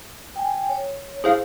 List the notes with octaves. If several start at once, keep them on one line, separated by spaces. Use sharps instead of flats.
G5 G#5
C#5
E4 G#4 C5 F5